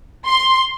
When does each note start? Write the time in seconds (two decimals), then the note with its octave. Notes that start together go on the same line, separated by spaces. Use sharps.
0.26 C6